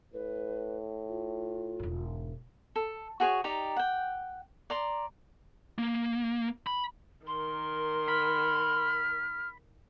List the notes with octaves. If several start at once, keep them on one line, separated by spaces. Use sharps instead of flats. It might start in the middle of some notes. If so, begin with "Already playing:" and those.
A2 B4
F4
E1 G#2
A4
F#4 G#4 C5 C#5
D#4 G4 D5 A#5
F#5 G5
D5 A#5 C6
A#3
B5
D#3 A#4 C6
B5 F6